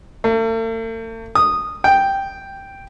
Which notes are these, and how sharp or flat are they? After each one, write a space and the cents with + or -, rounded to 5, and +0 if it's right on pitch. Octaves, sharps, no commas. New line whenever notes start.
A3 +45
D#6 -10
G5 +0